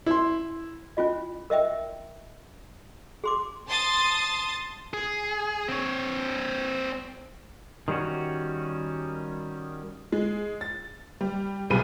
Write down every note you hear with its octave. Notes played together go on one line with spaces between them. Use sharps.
E4 C6
C#4 E4 F4 D#5
A#4 D#5 E5 G5
G#4 C6 D6
A5 C6 D#6 A6
G#4
C4 C#5
D#3 G3 A#3 C#4 F#4
G#3
A6
G3
B1 C3 G3 G#4 B5 D#7